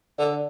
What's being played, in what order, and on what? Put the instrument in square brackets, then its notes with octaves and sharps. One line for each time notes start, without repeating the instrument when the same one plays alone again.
[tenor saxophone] D3